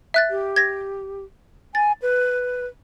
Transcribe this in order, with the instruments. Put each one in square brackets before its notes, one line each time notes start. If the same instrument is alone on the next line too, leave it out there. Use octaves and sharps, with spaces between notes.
[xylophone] E5 F#6 A6
[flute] G4
[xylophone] G#6 A#6
[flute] G#5 [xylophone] A6
[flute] B4